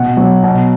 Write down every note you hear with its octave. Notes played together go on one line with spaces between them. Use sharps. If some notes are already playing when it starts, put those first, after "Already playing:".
Already playing: B2 F#5
F#3
B2